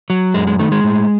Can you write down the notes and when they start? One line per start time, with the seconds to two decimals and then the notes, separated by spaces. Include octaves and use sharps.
0.10 F#3
0.34 F#2 G#3
0.47 G#3
0.59 D#3 A3
0.72 G#3
0.84 A2